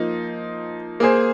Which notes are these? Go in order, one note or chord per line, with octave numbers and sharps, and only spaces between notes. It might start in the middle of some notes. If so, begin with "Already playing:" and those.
Already playing: F3 A#3 D#4
A#3 G#4 C5